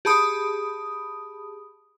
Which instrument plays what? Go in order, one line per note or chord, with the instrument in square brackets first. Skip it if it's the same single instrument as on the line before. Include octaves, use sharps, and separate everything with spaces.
[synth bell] G4 G#4 A5 B5 D#6